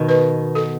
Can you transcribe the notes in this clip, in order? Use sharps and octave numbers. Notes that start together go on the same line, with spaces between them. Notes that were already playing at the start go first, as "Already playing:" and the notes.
Already playing: B2 D#3
B4
A4